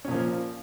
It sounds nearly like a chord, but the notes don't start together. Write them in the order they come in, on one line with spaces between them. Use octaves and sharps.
C#4 A#2 F3 A#3